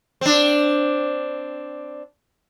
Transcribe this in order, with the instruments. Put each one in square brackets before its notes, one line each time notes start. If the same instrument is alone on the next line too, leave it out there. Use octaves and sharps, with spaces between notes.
[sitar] C4 D4